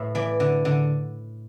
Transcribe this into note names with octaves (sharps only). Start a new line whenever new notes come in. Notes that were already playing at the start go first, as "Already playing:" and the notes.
Already playing: A2 B4 E5
E3 D5
D3
D3